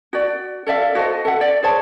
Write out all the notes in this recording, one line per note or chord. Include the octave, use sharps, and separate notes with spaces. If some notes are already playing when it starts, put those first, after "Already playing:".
F#4 D5
A4 D5 E5 F5
F#4 A4 C5 D#5
A4 E5 F#5
D5
G#4 C5 C#5 A5